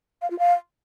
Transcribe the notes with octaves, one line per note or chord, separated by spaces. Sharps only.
F5
F4
F5